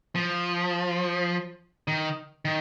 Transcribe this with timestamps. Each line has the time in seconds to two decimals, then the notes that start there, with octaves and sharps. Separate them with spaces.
0.15 F3
1.88 D#3
2.45 D#3